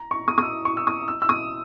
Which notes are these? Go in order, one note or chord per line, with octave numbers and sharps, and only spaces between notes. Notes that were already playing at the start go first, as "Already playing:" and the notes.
Already playing: A#5
C#6
D#6
D#6
E6
C#6
E6
D#6
E6
E6
D#6